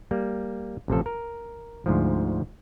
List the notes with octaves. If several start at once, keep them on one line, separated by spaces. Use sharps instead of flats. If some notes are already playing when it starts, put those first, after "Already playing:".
G3 A#3
A1 C3 F3 A4
A#4
D2 G#2 F3